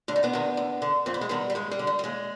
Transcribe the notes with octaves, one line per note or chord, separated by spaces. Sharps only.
D2 D4
D#4
B3 D4
C3 D#3
D2
D3
F2 C4
B3
G#3
C3 D#3 G3 B3
G3
G2 G#3
G3
D3
G3
G3
D#2 G#3